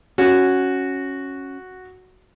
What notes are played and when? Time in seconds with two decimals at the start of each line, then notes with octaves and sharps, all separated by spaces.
0.18 C#4 F#4